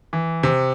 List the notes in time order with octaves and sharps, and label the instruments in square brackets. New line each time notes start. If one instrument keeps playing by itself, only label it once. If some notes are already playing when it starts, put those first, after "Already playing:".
[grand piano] E3
C3